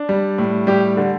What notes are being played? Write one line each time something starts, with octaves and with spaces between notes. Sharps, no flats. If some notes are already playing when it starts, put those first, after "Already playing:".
Already playing: D4
G3
A2
G3 G4
D3